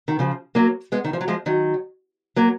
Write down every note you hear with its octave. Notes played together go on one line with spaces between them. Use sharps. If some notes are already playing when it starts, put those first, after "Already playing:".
D#3
C#3 F3
F#3 A#3
G#3 B3
D#3
F3
F#3
F3 G#3
D#3 F#3
F#3 A#3